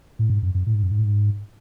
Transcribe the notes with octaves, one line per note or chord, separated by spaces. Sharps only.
A2
G#2
F#2
F#2
A2
G#2
F#2
G#2
A2
G#2